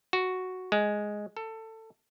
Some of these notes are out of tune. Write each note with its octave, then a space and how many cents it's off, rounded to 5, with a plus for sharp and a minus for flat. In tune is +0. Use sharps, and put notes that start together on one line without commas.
F#4 +0
G#3 +0
A4 +20